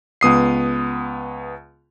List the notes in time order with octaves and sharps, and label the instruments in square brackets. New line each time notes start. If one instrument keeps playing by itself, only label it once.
[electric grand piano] C#2 B3 D#6 C7